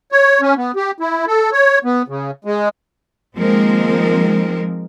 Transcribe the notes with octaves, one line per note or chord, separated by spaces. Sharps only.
C#5
C#4
B3
G4
E4
A4
C#5
B3
C#3
G#3
D#3 F3 G#3 A#3 C4 A#4